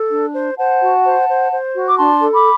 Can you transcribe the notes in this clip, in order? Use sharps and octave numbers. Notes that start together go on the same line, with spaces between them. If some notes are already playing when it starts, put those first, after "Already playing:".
Already playing: A4
D4
C5
C5 F#5 A5
F#4
C5
C5
C5
F#4
D6
D4 A5 C6
A4
B5 D6